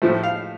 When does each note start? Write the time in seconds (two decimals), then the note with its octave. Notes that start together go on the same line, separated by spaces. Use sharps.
0.02 A2 F3 A3
0.24 F5